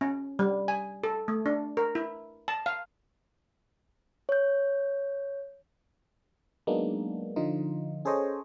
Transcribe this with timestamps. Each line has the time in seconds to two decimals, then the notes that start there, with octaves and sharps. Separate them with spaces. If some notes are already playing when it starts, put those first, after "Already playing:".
0.01 C#4
0.39 G3
0.68 G#5
1.04 A4
1.28 A3
1.46 D4
1.77 A#4
1.95 E4
2.48 A5
2.66 F5
4.29 C#5 G6
6.67 F#3 G#3 A#3 B3 D4 D#4
7.36 D3 F3 D#4 F4
8.05 C#4 G#4 A4 C5 C#5 D#5